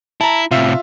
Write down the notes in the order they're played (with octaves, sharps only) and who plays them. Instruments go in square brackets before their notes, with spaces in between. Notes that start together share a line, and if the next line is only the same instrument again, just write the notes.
[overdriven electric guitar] E4 [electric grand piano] A5 A#5
[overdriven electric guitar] A2 C3 [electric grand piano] F4 E5